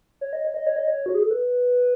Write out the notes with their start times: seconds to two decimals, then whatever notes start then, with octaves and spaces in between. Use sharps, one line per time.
0.21 C#5
0.33 D#5
0.44 C#5
0.54 D#5
0.66 C#5
0.76 D#5
0.87 C#5
1.06 F#4
1.15 G#4
1.22 A4
1.31 B4